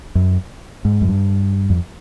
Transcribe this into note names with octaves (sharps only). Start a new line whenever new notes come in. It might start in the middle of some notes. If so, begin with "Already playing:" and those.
F#2
G#2
F#2
G2
F2